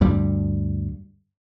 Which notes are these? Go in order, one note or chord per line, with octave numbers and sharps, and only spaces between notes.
D2 G2 G3